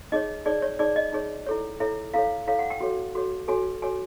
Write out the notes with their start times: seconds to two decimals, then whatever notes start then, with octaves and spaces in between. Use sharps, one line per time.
0.12 D#4 G#4 C#5 D#5
0.46 D#4 G#4 C#5 D5
0.62 C#5
0.79 D#4 G#4 C#5 D5
0.96 D#5
1.13 D#4 G#4 C#5
1.47 E4 A4 C#5
1.80 E4 A4 C#5 E5
2.14 E4 A4 C#5 F5
2.47 E4 A4 C#5 F5
2.59 F#5
2.70 G5
2.81 F#4 A4 C#5
3.15 F#4 A4 C#5
3.48 F#4 A4 C#5 G#5
3.82 F#4 A4 C#5 G#5